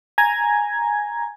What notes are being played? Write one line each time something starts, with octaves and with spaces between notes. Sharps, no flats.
G#5 A#5 G#6